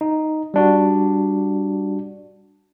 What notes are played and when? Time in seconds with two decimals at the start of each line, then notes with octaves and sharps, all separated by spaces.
0.01 D#4
0.54 G3 D4 F#4